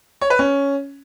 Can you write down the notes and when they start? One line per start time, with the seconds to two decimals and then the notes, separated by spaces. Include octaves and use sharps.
0.21 C#5
0.30 B4
0.39 C#4